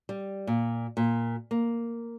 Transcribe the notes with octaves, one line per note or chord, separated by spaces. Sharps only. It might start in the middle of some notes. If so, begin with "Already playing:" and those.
G3
A#2
A#2
A#3